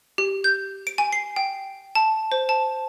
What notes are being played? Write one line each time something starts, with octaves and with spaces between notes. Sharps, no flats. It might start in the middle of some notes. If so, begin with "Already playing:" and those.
G4
G6
D7
G#5
C7
G5
A5
C5
A5